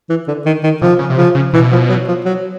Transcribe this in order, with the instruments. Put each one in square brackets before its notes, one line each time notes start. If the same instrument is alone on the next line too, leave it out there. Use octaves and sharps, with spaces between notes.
[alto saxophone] E3
D3
D#3
D#3
[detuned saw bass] C3 [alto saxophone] F3
[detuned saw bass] C#3
C3
[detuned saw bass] C#3 [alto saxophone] F3
[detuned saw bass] C#3
[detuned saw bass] B2 [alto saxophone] E3
[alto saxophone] F3
F#3
F3
F#3